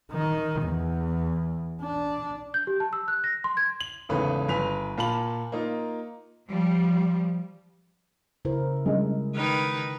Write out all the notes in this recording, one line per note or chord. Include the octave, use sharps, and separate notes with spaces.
D#3
E2
D4
G6
G4
A5
E6
F#6
A#6
C6
G#6
F#7
G#1 E2 C#3 A3 B4
G1 B4 G#5 B6 F7
A#2 F4 A5 B5 F#7
A#3 D#4 F4
F3 G3
C#3 E4 A#4 C5
G3 G#3 C#4 D4 D#5
D#3 D#4 B4